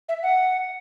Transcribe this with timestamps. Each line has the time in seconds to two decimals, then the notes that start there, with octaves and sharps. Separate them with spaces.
0.09 E5
0.23 F#5